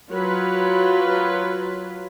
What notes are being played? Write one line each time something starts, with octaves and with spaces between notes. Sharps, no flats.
F#3 F4 B4